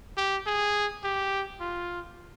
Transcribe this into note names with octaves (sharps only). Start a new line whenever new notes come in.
G4
G#4
G4
F4